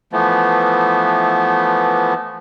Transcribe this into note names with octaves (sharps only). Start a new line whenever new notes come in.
E3 F3 A3 B3